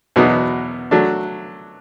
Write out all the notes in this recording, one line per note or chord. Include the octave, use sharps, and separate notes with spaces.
E2 B2 F#3 B3 D#4
F#3 A3 D4